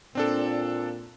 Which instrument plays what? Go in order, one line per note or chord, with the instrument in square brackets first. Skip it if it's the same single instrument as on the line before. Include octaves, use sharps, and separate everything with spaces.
[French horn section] A#2 [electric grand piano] C4 D4 A4